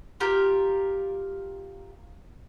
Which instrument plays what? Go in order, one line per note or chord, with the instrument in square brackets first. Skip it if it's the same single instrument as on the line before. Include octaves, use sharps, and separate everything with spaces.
[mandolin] F4 G4 A#4